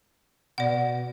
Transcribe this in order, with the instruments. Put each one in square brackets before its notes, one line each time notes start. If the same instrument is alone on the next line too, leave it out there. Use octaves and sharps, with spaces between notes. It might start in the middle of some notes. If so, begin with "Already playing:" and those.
[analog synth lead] B2 [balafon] D5 F#5